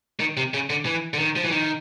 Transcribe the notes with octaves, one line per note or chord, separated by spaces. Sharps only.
D#3
C3
C#3
D3
E3
D3
D#3
F3
E3
D#3